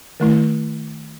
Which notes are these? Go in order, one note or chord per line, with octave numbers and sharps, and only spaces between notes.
D#3 A3 E4